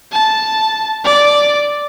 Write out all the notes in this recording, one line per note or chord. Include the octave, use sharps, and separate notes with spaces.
A5
D5